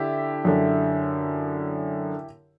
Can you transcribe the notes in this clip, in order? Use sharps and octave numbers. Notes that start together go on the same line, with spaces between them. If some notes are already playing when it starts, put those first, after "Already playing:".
Already playing: D3 E4 G4
F#2 D3